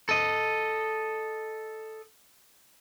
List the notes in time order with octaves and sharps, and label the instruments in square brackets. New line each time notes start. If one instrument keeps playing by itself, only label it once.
[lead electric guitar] A4 D#5